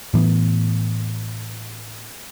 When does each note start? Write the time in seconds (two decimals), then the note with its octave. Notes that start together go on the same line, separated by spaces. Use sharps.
0.14 A2 E3 B3